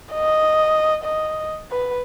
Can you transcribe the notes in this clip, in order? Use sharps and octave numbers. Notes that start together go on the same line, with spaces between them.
D#5
D#5
B4